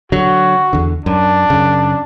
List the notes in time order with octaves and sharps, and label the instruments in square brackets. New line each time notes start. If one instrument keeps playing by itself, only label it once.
[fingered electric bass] D3 F#3 [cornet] F#4
[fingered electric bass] E2 D3
[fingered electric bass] F#2 [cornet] D4
[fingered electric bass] F#2 C#3